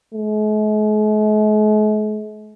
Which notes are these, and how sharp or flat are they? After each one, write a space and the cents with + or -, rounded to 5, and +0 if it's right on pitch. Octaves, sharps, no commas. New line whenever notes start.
G#3 +45